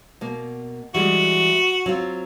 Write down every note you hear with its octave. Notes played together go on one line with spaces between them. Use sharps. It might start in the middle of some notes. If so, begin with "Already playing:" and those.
B2 A#3
E3 G3 G#3 F#4
F#3 C4 F4